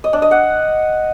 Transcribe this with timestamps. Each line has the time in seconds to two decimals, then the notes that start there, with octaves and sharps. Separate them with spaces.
0.04 D#5
0.13 D4
0.22 D#5
0.31 F#5